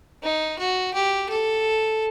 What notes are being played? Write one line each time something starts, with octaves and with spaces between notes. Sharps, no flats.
D#4
F#4
G4
A4